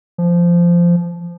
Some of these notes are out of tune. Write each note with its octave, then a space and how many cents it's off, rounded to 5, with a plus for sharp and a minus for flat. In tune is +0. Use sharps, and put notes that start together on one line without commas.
F3 -15